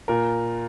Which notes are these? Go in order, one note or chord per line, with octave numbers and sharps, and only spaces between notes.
A#2 A#4